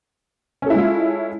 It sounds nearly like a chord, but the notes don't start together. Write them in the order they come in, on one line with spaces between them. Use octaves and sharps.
C#4 A4 E4 G#3 F4